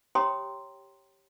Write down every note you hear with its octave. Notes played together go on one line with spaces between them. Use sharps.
G4 C#5 G5 A#5 C6 D#6